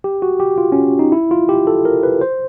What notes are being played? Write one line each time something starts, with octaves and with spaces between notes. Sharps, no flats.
G4
F#4
G4
F4
C#4
D#4
E4
F4
G4
A4
A#4
B4
C5